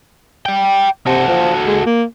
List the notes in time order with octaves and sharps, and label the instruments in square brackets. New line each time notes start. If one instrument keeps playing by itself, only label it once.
[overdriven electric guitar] D5 G5
[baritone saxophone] C3 [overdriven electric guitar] F#4 A4
[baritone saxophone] F3
G#3
A#3